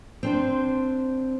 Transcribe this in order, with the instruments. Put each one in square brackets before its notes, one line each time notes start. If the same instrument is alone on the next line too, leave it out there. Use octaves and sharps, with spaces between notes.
[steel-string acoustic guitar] C4 D4 C5